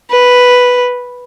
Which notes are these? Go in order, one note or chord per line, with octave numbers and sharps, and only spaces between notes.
B4